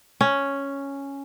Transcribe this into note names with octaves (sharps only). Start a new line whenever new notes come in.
C#4